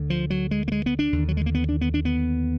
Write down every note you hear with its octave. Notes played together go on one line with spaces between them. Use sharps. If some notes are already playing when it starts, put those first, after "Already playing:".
Already playing: D2 D3
F3
F#3
G#3
A#3
G#3
B3
D4
D#2 D3
F#3
G#3
A#3
B3
D4
B3
D4
B3